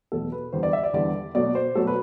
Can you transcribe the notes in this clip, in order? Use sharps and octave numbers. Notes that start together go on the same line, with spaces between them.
E2 B2 F#3 A3 A4
B4
E2 D3 G3 C5
D5
E5
D5
E2 D3 G3 D5
B2 F#3 A3 D5
C5
B2 F#3 A3 A4
B4